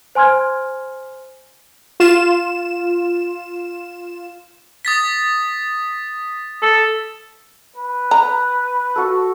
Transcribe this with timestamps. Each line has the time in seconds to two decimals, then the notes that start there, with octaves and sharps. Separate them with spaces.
0.15 C5 G#5 C6 F6 G#6
2.00 F4 E7
4.85 D#6 A6 B6
6.62 A4
7.76 B4
8.11 A#5
8.96 F#4 A4